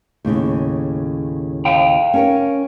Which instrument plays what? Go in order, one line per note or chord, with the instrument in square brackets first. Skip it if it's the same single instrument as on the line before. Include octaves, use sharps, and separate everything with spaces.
[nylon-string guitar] D#2 A2 C#3
[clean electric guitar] F5 G5 A#5
[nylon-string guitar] C#4 A#4 C#5